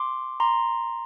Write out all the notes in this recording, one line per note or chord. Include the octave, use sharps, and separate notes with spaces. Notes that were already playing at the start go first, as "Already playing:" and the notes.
Already playing: C6 D6
A#5 C6